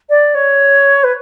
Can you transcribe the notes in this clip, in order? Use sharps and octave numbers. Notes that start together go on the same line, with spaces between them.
D5
C#5
B4